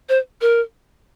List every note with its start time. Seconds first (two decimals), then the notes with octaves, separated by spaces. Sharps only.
0.09 C5
0.41 A#4